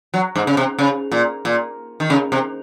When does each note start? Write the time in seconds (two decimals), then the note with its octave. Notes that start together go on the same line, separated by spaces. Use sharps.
0.14 F#3
0.36 G#2
0.47 C#3
0.57 C3
0.79 C#3
1.12 A#2
1.45 A#2
2.00 D#3
2.10 C#3
2.32 C3